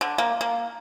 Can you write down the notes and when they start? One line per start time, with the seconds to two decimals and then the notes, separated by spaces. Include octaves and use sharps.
0.01 D3
0.18 A#3
0.41 A#3